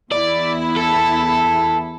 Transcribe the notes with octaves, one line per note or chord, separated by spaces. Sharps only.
E2 E4 D5
A4